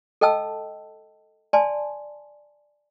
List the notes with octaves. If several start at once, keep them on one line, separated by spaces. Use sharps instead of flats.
A4 D#5 G5 A5 E6
D5 G#5 A5 C6